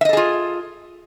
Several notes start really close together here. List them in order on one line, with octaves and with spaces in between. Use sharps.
E5 D#5 A4 G#4 F4